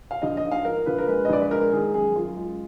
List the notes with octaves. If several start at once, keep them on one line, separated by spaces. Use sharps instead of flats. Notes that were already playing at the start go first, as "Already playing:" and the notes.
F5
A#1 D#5
D#5
G#2
F5
F3 A#4
A#1 B4
A#4
G#3 B4
D#5
A#1 D5
B4
G#3 A#4
D#3 G#4
F#2 G#4
F#2 F4
G#3